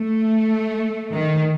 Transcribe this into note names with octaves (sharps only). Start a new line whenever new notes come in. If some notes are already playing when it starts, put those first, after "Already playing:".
Already playing: A3
D#3